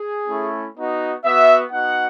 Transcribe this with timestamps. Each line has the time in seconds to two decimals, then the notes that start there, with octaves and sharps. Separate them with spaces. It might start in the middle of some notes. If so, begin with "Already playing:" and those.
Already playing: G#4
0.27 A3 C#4 E4
0.76 B3 D#4 F#4
1.24 B3 F#4 E5
1.72 B3 D#4 F#4 F#5